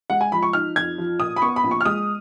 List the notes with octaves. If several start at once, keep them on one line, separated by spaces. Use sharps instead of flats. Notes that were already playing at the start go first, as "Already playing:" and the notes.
G#3 F#5
G#5
F3 B5
C#6
D#4 F6
F2 G#6
F3
A#2 D#6
B5
B3 C#6
B5
A#1
C#6
F6
G#3 D#6